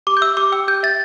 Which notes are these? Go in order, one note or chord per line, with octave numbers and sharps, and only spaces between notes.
G4 D6
G6
E5 E6
G4 D6
G5 E6
G4 G6
E5 A6